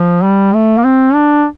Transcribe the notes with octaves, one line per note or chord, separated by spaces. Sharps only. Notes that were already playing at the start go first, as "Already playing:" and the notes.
Already playing: F3
G3
A3
A#3
C4
D4